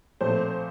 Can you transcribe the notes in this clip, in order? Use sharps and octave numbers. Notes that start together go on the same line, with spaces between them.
A#2 F3 A3 C4 C5